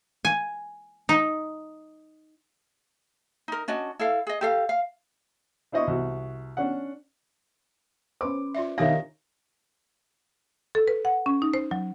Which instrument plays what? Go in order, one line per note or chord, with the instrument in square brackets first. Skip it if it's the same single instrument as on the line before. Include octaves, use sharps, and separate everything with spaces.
[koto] G#5
D#4
[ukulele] D#4 A#4
C#4 D4 F#4 D#5
E4 A4 F5
G#4 D#5
G4 A4 F5
F5
[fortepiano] D4 E4 C5 D#5 C#6
C2 F#4
C#4 D4 F#5
[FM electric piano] C#4 B4 C5 [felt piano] D6
[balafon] F4 D5 E5
[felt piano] D#3 A#6 [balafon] D4 G4 C#5 [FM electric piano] E5 F5
[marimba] A4
B4
F#5
C#4
D#4
C5
F#3